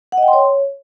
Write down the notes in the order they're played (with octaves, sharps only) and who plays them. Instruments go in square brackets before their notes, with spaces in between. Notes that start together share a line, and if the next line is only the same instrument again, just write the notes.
[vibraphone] F#5
D#5
G5
C6
C#5